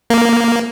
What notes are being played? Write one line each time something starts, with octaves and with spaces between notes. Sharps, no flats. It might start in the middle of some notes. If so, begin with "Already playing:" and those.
A#3